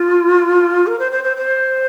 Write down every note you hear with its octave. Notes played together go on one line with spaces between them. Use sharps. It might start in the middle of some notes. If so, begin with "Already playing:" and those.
Already playing: F4
A#4
C5
C5
C5
C5